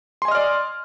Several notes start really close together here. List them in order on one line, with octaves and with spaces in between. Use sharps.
C6 G#5 D#5 F6 D5